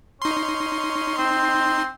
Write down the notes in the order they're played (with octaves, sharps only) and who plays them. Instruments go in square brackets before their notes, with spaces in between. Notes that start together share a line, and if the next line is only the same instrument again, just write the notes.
[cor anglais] C#4 [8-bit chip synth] D#4 C6
[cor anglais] C4